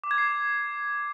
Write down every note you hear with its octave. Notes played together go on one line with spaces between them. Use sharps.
D6
G#6
C7